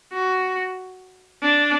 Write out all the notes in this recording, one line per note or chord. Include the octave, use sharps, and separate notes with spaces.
F#4
D4